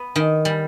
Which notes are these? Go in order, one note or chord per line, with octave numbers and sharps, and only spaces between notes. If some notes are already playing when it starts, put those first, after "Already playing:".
Already playing: B3
D#3
G3